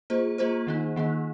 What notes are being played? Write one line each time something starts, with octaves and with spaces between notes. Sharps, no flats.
A#3 F4 G#4 C5
A#3 F4 G#4 C5
D#3 A#3 D#4
D#3 A#3 D#4